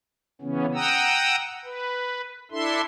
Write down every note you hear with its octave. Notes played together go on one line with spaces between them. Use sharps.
C#3 E3 B3 C#4
F#5 G5 A#5 D#6 E6
B4
D4 E4 A4 E5 C6